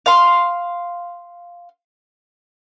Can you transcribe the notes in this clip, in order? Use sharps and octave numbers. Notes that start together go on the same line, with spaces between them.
F5 C6